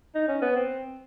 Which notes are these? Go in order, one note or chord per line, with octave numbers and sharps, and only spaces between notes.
D#4
C#4
B3
C4